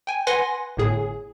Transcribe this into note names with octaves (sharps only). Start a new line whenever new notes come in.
G5 G#5
B4 F#5 G#5 C6 A#6
G1 A2 G#4